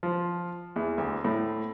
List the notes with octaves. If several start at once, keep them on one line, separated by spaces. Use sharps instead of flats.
F3
E2
D2
A2